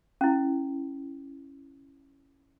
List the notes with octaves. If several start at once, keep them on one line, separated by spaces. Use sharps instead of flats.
C#4 E4